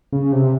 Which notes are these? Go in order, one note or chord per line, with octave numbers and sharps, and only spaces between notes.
C#3
C3